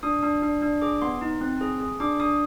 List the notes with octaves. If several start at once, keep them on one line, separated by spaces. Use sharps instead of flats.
D4 D#6
D4
D4
D4
G#4 D6
B3 C6
D#4
C4
G#4
G#4
D4 D6
D4 D#6